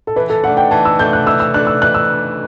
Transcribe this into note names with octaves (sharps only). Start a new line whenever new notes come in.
A4
E3 B4
A4
A3 D4 F#5
G5
E3 A5
E6
A3 D4 G6
F#6
E3 E6
E6
A3 D4 F#6
E6
E3 F#6
E6